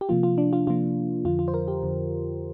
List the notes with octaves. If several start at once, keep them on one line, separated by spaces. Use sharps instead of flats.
G4
C3 F3 A#3 F4
F4
D4
F4
C3 F3 A#3 F4
F2 D3 F3 F4
F4
C5
A#4
G4
F2 D3 F3